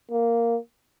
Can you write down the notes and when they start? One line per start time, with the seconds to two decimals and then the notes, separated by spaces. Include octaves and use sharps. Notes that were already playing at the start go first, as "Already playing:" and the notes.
0.11 A#3